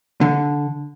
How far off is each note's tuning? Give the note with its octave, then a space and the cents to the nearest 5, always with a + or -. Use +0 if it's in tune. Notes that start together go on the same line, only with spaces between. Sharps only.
D3 -10